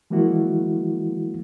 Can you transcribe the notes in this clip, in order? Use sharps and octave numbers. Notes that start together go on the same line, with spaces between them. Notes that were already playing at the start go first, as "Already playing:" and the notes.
E3 F3 G#3 A#3 E4 F#4